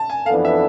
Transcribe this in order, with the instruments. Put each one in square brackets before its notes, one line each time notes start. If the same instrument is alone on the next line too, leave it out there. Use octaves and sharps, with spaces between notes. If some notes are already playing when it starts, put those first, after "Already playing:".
Already playing: [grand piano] A5
G#5
[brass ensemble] F2 E3 B3 D4 A4 [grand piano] F5
[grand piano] E5